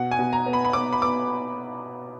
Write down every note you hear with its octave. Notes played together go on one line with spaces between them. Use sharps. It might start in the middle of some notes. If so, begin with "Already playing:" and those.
Already playing: B2 F#5
G#5
B2
A#5
B3
B5
B5
B3 D6
B5
B3 D6